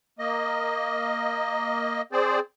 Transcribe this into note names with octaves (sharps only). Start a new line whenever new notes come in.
A#3 D#5
C4 G#4 C5 D5